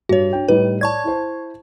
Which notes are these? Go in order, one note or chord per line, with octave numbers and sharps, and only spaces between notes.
G2 F#4 C#5
D4 G5
A2 G3 D#4 B4
C#5 D5 A5 C#6 G#6
E4 C5